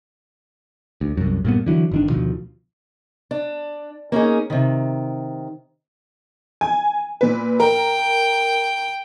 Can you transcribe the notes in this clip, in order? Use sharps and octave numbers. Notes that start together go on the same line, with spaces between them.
D2
C2 F#2
G2 A#2 B3
D3 E3 F#3
G1 D#3 D4
D2 B2 D#3 F3
D4
A#3 C#4 D#4 G#4
C3 D#3
G#5
A#2 B4
A#4 G5